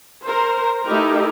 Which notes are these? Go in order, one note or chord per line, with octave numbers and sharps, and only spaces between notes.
A#4 C5
A3 D#4 E4 G4 A#4